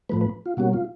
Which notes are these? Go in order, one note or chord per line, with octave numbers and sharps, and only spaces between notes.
A2 F3 A3 B4
B4
F4
B2 G3 A#3 C#4 F#4
F4